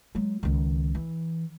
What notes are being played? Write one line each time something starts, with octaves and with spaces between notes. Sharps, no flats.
F#3 G#3
C#2 D#3
E3